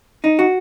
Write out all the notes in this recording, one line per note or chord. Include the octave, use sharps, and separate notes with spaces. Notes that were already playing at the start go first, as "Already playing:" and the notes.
D#4
F#4